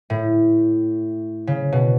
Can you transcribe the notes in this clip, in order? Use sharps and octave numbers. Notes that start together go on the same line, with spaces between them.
A2
C#3
B2